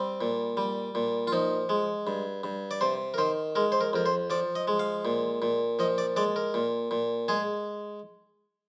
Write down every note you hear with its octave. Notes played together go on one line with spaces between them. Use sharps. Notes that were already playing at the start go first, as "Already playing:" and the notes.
Already playing: G3 C4
A#2
G3
A#2
F4
F3 D#4
G#3
G2
G2
D5
C3 C5
A#4
D#3 C5
G#3 A#4
C5
A#4
F2 A#4
C5
F3 D5
D#5
G#3
F5
A#2
A#2
F3 D#5
D5
G#3 D5
A#4
A#2
A#2
G#3 G#4